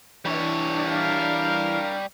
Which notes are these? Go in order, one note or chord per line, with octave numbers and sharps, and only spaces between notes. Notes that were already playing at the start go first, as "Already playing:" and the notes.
E3 G3 D4 C#5
A#4 F5